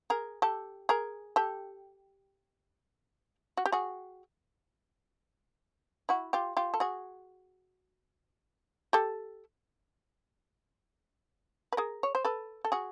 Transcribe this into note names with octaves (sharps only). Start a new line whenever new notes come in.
G#4 A#4
G4 A4
G#4 A#4
G4 A4
F#4
G4
F#4 G#4
E4 F#4
F4 G4
F4 G4
A4
F#4 G#4
G4 A4
B4
G#4 A#4
C#5
C5
A4 B4
A4
F#4 G#4